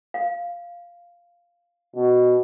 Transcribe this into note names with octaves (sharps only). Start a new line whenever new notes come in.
F5
B2